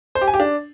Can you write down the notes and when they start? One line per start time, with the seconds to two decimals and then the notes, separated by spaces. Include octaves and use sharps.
0.15 C5
0.21 G4
0.28 G#5
0.34 G4
0.40 D4